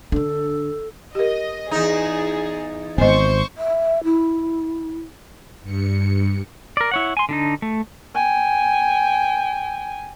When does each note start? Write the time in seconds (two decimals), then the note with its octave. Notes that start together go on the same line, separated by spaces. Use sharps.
0.12 D3 D4 A4
1.15 G4 A#4 D#5
1.71 E2 D#4 G#4
2.98 D#1 G#1 B3 C5 D#5 C#6
3.57 E5
4.04 E4
5.62 G2 C#7
6.77 A#4 D5
6.91 E4 C#5 F#5
7.17 G#5 C6
7.29 D3 D4 D#4
7.62 A3
8.15 G5 G#5